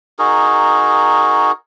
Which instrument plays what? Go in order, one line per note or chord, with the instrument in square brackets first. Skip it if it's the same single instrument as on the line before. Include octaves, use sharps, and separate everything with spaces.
[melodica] D#4 F#4 G#4 A#4